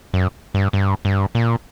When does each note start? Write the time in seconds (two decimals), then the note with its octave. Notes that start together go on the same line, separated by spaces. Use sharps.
0.14 F#2
0.54 G2
0.73 G2
1.05 G2
1.35 A#2